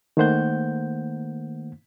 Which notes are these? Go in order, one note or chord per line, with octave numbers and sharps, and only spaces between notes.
D#3 A3 A#3 C5 F#5 G6